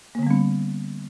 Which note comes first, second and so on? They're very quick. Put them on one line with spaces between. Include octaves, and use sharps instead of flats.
A#3 D3 B3 G3 C#4